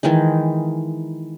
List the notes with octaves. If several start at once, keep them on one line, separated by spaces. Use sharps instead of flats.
D#3 E3 G#3 D#4